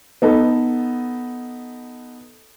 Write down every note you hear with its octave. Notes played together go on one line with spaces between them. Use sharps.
B3 D#4 A4